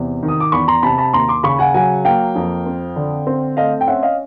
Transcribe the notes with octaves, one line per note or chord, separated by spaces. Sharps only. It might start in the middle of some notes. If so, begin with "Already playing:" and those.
Already playing: E2 C3
D#3
D#6
D6
E2 B5 C#6
A#5 C6
C3 A5 B5
A5 B5
D#2 A#5 C6
C6 D6
C#3 B5 C#6
F#5 G#5
F#3 F#5 G#5
A#3 F5 G5
F2
C4
D3
C4
A3 D#5 F5
G5
C#4 E5 F#5
D#5 F5